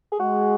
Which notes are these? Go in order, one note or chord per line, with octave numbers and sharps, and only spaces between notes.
G#4
G#3 F#4